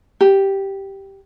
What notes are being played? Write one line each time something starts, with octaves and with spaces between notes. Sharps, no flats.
G4